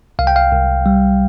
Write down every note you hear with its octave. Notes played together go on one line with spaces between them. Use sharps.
C2 F5
G5
F5
C2
G3